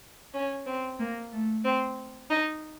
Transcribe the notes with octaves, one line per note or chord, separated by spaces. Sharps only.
C#4
C4
A#3
A3
C4
D#4